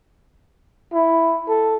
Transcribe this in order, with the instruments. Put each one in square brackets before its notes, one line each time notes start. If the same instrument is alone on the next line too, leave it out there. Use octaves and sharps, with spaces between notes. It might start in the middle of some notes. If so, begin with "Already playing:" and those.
[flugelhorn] E4
A4